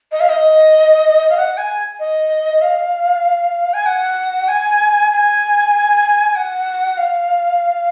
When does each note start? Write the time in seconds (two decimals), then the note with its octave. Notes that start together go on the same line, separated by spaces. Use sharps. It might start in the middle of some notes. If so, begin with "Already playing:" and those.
0.12 D#5
0.20 F5
0.29 D#5
1.29 F5
1.37 F#5
1.57 G#5
2.00 D#5
2.61 F5
3.73 G#5
3.86 F#5
4.48 G#5
5.11 G#5
6.35 F#5
6.97 F5